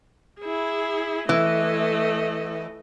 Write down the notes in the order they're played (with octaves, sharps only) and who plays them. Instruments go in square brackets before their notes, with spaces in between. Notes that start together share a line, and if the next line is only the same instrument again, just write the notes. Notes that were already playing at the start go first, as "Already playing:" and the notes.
[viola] E4 G#4
[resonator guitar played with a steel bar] E3 [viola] A3 D#5